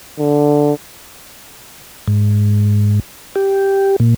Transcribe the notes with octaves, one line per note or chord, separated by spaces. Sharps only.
D3
G#2
G4
A#2